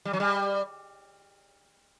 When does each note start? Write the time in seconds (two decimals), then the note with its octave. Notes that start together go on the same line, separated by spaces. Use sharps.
0.05 G3
0.13 F#3
0.20 G3